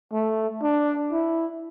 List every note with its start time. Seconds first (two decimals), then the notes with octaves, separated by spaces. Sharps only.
0.13 A3
0.62 D4
1.12 E4